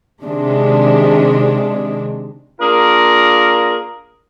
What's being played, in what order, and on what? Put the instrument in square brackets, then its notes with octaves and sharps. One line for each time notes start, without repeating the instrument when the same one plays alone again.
[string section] C3 D#3 G#3 D4
[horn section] A#3 D4 F4 G#4 A#4